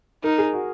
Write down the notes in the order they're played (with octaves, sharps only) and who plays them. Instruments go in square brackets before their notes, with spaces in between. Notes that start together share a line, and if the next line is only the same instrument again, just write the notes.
[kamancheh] D#4 [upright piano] A#4
[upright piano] G#4
F#4